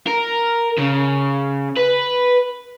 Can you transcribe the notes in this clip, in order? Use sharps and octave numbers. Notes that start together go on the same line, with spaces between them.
A#4
C#3
B4